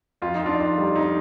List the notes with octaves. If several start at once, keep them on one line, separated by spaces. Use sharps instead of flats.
F2 F4
D#4
F2
D4 F4
F2
G3
F2 D#4